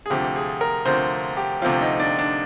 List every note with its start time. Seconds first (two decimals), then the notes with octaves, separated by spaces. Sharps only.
0.06 G#4
0.10 D2 C3 F3 G4
0.36 G#4
0.61 A#4
0.86 D2 C3 F3 C5
1.37 G4
1.62 D2 C3 F3 F4
1.81 D#4
2.00 D4
2.19 D4